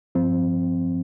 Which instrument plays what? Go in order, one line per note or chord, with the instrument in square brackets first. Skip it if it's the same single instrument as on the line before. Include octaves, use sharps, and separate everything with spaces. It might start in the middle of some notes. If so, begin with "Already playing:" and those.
[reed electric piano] G2 F3 C4